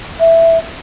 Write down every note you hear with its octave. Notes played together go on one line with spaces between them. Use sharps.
E5